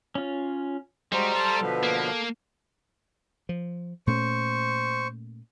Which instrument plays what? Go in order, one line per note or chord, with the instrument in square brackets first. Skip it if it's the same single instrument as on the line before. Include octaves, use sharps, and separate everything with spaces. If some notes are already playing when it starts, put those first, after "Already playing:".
[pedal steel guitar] C#4 F4
[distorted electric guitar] G3 [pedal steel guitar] G#3 F#4 [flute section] C5 A#5 C6
[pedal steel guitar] A4 F5 [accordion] A5
[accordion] B2 D3 F3 [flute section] B4
[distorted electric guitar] A#3
[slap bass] F3
[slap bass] A#2 A3 C#4 [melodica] C5 C#6